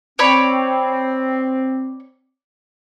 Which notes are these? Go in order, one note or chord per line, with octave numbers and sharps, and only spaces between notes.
C4 C#5 D5 B5